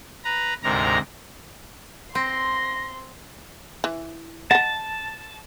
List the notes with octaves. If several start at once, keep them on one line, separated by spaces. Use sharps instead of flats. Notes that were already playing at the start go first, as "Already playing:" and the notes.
B4 A#5
D2 G#2 C3 A#4 A#5
C4 C6 A#6
E3
D#5 F#5 A5